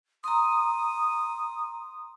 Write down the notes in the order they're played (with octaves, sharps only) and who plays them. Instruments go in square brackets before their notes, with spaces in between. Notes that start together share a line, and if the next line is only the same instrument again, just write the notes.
[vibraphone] A#5 C6 [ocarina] D#6